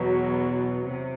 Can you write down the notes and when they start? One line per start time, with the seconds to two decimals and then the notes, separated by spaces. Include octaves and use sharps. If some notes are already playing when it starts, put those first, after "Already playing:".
Already playing: E2 B2 F#3
0.86 C3